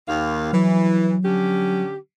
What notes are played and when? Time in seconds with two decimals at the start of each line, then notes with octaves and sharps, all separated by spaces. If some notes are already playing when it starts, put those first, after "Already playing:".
0.08 D#2 F5
0.53 E3 F#3
1.24 D3 C#4 G4